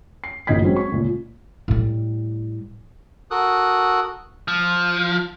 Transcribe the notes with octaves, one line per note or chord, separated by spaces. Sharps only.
C7
A1 D2 A#2 D#5 G#6 B6
F#3 G#3 C4 C#4
C#6
C#2 A#2
A2 G3
F#4 A4 A#4 D#6 F#6
F3